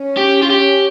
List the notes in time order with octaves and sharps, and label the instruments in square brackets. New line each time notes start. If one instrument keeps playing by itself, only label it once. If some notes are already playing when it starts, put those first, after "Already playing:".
Already playing: [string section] C#4
[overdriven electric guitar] G4
F4
G4